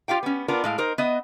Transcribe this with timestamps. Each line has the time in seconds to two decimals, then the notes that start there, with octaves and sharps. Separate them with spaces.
0.08 F4 G4 F5 G5
0.23 B3 C#4
0.48 B3 D4 F4 A#4
0.64 A2 G#3 F5
0.78 D#4 A#4 C5
0.98 B3 D#5 E5